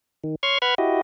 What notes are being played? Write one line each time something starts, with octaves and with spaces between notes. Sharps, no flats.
D#3
C#5 C6 C#6 F6 G#6
B4 F#5 B5 F6 G#6
E4 F#4 G4 D#5